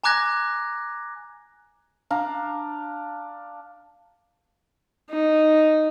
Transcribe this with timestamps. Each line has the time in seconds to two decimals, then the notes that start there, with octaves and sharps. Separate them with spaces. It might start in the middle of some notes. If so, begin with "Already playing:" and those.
0.04 G#5 A#5 D6 F#6 G#6 A#6
2.10 D4 F5 A#5
5.10 D#4